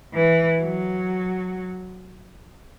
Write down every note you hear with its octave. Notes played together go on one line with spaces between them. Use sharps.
E3
F#3